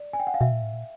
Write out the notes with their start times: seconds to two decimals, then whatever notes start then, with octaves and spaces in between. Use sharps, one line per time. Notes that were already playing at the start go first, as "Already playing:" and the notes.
Already playing: D5
0.13 G#5
0.20 G5
0.27 F#5
0.34 F5
0.41 B2 E5
0.52 A#2
0.62 A2
0.73 A#2